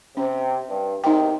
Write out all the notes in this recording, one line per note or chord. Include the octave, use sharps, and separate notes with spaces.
C3 C#4
G2
E2 C3 D#3 D#4 G5